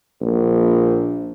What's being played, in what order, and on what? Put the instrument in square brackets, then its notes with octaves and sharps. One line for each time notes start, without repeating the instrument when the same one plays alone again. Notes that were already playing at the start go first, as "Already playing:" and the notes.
[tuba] A#1